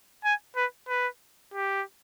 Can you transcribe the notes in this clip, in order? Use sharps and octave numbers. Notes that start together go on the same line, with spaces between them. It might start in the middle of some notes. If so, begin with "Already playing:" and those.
G#5
B4
B4
G4